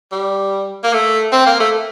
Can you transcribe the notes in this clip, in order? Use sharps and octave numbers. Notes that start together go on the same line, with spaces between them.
G3
A#3
A3
C4
A#3
A3